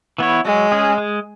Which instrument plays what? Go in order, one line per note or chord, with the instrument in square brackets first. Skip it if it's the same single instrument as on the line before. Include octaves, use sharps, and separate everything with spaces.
[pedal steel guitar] E3 B3 E4 C#5
[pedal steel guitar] F#3 [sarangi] G#3
[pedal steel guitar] C#4 G#4
G#3